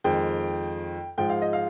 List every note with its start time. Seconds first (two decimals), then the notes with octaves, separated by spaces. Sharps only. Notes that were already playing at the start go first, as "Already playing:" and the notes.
0.04 F2 D#3 G#3 G5
1.18 G#2 F3 G#3 G5
1.29 F5
1.42 D#5
1.53 F5